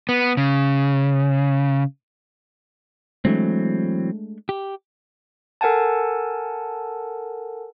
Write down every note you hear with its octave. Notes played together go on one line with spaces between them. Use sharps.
B3
C#3
E3 F#3 G#3 A3 C4 D4
G4
A4 A#4 F#5 G#5 A5